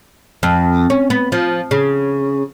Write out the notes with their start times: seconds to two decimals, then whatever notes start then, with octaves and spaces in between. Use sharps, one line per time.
0.43 F2
0.90 C#4
1.10 B3
1.32 F3
1.71 C#3